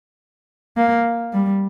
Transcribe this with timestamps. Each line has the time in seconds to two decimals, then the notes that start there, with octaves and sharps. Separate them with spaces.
0.77 A#3
1.33 G3